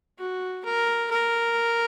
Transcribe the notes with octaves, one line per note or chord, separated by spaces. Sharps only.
F#4
A#4
A#4